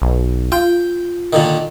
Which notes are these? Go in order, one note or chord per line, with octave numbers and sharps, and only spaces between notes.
B1
F4 G5
A#2 D3 D#3